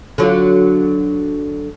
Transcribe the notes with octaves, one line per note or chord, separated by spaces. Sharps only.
D3 F#3 F4